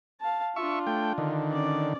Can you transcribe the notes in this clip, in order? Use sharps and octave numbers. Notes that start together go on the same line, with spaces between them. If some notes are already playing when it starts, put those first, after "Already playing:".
F5 A5
D4 F4 E5 C#6
A3 G5
D3 D#3
C#4 D5